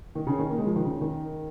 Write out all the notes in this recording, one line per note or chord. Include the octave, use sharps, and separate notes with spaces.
D#3
C#3
D#3
A#3
G#3
F3
D#3
C#3
D#3